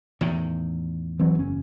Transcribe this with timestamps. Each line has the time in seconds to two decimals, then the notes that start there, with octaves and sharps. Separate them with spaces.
0.21 E2 A2 D#3
1.19 E3 F#3 C4
1.35 F#1 C#4